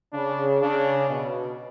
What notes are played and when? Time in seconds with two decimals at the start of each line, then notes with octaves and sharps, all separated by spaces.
0.13 C#3 D4
0.62 C#3 D4
1.10 B2